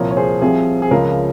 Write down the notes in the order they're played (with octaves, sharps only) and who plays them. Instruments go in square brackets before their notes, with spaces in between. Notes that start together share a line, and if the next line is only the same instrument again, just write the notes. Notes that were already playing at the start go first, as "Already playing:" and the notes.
Already playing: [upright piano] C2 A#2 F3 A#4 C#5
C#5
G#4 C5
C2 C3 F3 C4 G#4
G#4
C#2 C#3 F3 A#4